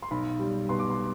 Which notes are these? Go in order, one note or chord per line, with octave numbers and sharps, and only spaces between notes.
C6
B1 B5
G3
B2 C6
D6
C6